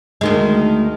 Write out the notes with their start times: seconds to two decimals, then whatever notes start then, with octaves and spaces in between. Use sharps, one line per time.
0.21 D2 D#3 G#3